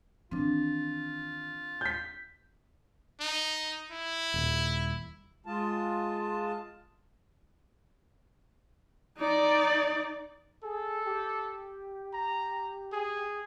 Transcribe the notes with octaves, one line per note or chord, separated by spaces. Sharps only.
D#3 E3 C4 D4 F4
G6 B6
D#4
E4
D#1
G#3 F4 A5
D#4 D5
G#4 A4
G4
A#5
G#4